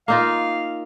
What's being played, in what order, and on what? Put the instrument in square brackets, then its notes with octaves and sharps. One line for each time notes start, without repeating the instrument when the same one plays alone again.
[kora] A#3 D#4 F4 [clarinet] F5